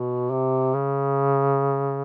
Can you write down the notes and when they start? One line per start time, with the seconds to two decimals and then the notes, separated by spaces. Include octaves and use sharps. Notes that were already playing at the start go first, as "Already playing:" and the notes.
Already playing: B2
0.31 C3
0.74 C#3